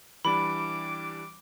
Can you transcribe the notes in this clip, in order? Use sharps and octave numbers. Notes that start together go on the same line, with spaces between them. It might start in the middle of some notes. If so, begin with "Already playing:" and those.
E3 G3 D4 B5 D6